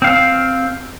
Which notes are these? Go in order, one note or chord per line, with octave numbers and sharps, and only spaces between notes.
C4 F5